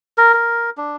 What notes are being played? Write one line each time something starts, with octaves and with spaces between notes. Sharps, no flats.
A#4
A#4
D4